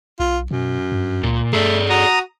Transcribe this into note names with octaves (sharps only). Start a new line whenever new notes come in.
B1 F4
F#2 B2
G2
C#2 A#2
G2 A3 G#4 A4 D5
F#4 A#5 D#6